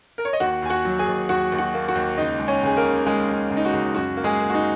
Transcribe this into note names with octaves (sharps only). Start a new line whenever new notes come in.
A#4
C#5
D#5
D#2 F#4 F#5
D#2 G#5
F#4 F#5
F#3
G#4 G#5
D#2
D#2 F#4 F#5
D#2
F#4 F#5
A#3
F#4 F#5
D#2
C#2 D#4 D#5
G#3
C#4 C#5
C#2 G#4
A#3 A#4
C#3
C#2 G#3 G#4
G#3
C#2
D#4
F#4
C#2
F#2 F#4
A#3
G#3 G#4
A#3
F#4
D#4